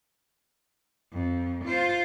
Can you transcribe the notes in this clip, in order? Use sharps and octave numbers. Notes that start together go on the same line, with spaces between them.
F2
F4 C5